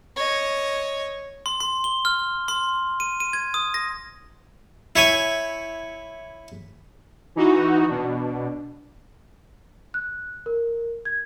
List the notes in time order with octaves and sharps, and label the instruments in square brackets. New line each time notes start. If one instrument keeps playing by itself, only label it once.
[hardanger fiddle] C#5 D#5
[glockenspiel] C6
C6
G7
F6
C6
D#7
D#7
G#6
D#6
A#6
[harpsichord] E4 C#5 G#5
[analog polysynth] E3 D#4 F#4
B2 D4
[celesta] F#6
A#4
G#6